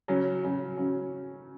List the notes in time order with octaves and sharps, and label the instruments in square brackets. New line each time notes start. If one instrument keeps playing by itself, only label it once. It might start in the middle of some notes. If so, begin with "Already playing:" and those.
[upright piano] C#3 F#3 C#4
C#3 F#3 C#4
C#3 F#3 C#4